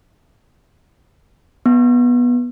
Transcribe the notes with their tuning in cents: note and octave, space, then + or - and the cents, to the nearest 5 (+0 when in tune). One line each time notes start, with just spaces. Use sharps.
B3 -15